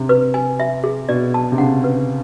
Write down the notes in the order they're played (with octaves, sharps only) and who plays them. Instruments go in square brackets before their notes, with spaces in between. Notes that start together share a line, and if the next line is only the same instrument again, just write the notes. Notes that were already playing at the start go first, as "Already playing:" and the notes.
Already playing: [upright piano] C3
[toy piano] B4
G#5
E5
G#4
[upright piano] B2 [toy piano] D5
[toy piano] A5
[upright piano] C3
[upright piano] C#3 [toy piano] F#5
[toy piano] B4